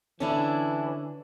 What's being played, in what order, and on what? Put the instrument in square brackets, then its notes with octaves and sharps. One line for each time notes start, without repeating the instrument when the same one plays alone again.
[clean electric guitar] D3 [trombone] E3 [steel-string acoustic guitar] C#4 D4 E4